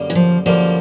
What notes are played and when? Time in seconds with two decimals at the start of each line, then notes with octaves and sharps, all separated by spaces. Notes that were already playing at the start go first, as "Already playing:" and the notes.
Already playing: F#2 D3 G3 A#3
0.10 E3
0.15 F3
0.46 F#2 D3 F3 G3 A#3